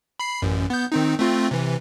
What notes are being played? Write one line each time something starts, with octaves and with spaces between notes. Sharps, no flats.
B5 C7
A1 F#2
B3 G6
D#3 C4 D#4
A3 C4 F4
C3 E3